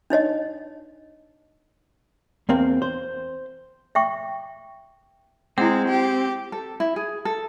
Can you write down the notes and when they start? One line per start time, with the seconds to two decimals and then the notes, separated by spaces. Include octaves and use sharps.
0.10 D4 D#4 C#5 D#5
2.49 E2 A#3 C4
2.82 C5
3.95 E5 G5 C#6
5.58 G#3 C4 E4 F#5
5.88 G4
6.52 A4
6.80 E4
6.96 G#4
7.25 A4